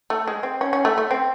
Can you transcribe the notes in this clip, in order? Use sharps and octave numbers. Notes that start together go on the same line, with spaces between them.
A3
G#3
C4
C#4
C#4
A3
A3
C4